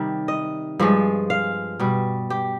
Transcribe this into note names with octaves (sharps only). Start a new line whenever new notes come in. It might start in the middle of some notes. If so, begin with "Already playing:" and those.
Already playing: C3 D#3 G3
D#5
G2 F3 G#3
F5
B2 G3
G4